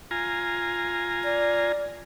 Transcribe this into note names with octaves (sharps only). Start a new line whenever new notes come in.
F4 G#5 A#5
D5